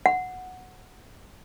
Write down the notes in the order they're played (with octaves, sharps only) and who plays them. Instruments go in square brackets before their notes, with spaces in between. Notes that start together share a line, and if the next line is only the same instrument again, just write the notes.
[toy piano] F#5